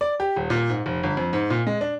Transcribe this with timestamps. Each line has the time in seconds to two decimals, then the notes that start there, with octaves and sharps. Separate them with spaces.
0.01 D5
0.20 G4
0.36 D#1
0.50 A#2
0.69 G#2
0.86 F1
1.03 G1
1.17 F2
1.33 G#2
1.50 A#2
1.67 G#3
1.81 D4